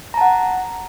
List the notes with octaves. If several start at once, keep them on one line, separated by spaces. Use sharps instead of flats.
F#5 A5 A#5